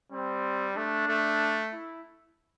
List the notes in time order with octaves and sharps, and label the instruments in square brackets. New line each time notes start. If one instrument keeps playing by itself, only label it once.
[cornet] G3 [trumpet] C4
[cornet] A3 [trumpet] D4
[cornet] A3
[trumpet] E4